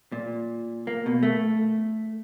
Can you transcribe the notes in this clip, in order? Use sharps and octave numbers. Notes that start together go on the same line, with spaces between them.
A#2
A#3
B2
A3